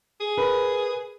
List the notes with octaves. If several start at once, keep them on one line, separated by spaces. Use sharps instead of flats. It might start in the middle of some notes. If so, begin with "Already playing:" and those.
G#4
A#4 B4 B5